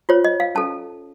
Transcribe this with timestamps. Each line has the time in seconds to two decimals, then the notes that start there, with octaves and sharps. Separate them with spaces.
0.09 F4 C5 C#5
0.25 D#5
0.40 F5
0.55 C#4 A4 A5